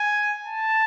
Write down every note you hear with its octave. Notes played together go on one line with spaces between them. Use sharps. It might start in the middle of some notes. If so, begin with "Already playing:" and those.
Already playing: G#5
A5